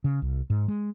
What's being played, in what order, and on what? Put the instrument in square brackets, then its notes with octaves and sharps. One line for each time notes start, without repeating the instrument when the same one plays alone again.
[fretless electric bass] C#3
C2
G#2
G#3